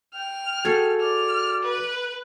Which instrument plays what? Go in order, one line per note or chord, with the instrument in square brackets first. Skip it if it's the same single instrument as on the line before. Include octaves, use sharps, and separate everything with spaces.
[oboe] G5 [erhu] F6
[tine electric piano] F#4 G#6 [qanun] G#4 A4
[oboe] D5 [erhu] F6
[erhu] B4